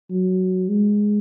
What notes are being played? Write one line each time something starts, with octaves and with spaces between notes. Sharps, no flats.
F#3
G#3